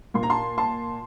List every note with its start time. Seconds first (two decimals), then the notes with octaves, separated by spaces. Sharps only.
0.14 A#2 C6
0.23 A#5
0.30 A5 C6
0.58 A5 C6